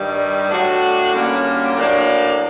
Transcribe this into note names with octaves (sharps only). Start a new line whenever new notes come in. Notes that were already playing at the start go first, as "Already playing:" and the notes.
Already playing: G2 D#3 G3
A2 A3 D4 F#4
F#2 D3 G3 A#3
A2 F#3 A#3 D4